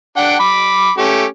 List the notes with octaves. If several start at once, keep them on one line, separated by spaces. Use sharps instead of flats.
D4 F#5 G5
B5 D6
A3 C#4 G4